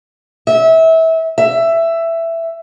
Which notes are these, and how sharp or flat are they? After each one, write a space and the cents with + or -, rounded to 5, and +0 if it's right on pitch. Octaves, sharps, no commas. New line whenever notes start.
E5 -25
E5 +10